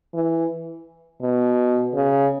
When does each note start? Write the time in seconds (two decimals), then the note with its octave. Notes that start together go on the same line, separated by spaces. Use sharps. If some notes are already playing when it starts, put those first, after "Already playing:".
0.14 E3
1.22 B2
1.94 C#3